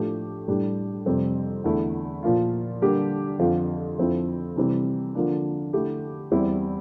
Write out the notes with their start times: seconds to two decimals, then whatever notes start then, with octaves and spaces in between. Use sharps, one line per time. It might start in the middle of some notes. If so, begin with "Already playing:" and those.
Already playing: A2 F3 A3 D4 G4
0.48 A2 G3 D4 G4
1.06 F2 C3 G3 C4
1.64 E2 D3 A3 E4
2.23 A#2 F3 A#3 F4
2.82 D3 G3 A#3 D4 G4
3.39 F2 D3 F3 C4 F4
3.98 F2 D3 F3 C4 E4
4.56 C3 E3 G3 C4
5.15 D3 F3 A#3 D4
5.73 D3 A3 E4 G4
6.31 E2 E3 G3 C4 E4